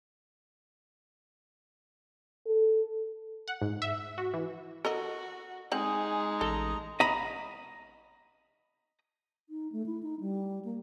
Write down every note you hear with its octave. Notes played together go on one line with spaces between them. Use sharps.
A4
F#5
G#2
E5
F#4
E3
F#4 A4 A#4 D#5
G#3 C4 D#4 G#4 F#5
A1 A4 A#5
D#5 A#5 B5
D#4
A3
E4
D#4
G3
A#3